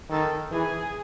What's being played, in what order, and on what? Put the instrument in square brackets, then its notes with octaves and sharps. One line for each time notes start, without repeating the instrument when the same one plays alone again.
[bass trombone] D#3 [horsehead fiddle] A4
[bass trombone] E3 [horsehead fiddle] G#4